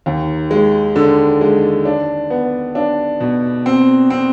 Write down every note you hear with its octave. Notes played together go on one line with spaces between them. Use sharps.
D#2
G#3
D3
G#3
D4
B3
D4
B2
C4
C4